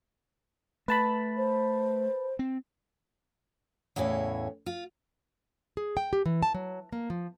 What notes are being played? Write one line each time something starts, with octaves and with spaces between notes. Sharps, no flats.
A3 B4 A5 B5
C5
C4
E2 A2 C#3 E3 C#5
F4
G#4
G5
G4
E3
A5
F#3
A#3
F3